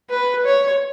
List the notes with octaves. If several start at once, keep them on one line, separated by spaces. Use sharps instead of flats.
B4
C#5